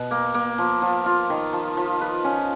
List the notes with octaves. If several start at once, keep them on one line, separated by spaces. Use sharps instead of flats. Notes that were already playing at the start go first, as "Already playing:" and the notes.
Already playing: B2
A#3
A#3
F3
F3
F4
D#3
F3
F3
B4
C#4